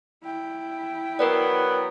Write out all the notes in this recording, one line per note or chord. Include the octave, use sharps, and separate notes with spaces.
E4 G5
F#3 B3 A#4 B4 D5